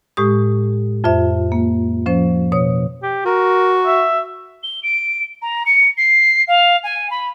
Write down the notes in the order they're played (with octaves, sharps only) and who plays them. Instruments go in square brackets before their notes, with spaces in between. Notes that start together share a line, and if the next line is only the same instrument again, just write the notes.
[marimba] A2 G#3 G4 D#6
F2 F4 C5 E5
A#3
F3 C#4 C5
B2 C#5 D#6
[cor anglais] G4
[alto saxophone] F#4 [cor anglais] A#4
[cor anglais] E5
[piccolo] G7
D7
A#5
C#7
C7
F5
G#5
B5